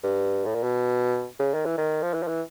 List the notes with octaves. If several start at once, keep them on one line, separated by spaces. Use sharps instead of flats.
G2
A2
A#2
B2
C#3
D#3
E3
D#3
F3
E3
F3
E3